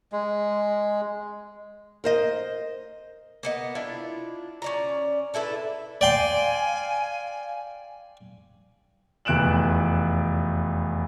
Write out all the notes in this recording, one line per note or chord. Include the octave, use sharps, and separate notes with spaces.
G#3
A#4 C5 D#5
A#3 B3 D#5
D4 E4 F4
C#4 D5 A#5
D4 E4 A4 B4
D5 F5 G5 G#5 C6
F1 E2 F#6 D7 E7 F#7